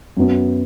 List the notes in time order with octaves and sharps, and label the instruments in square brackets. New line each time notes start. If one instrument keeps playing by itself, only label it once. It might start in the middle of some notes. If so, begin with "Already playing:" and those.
[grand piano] F#2 F#3 B3